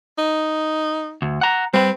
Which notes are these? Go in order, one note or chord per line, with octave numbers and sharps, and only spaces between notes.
D#4
D2
F#5 A#5
G3 C4 B4